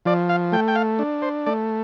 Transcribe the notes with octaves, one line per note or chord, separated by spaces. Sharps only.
F3 D5
F5
A3 G5
G5
F5
D4
C5
A3 D5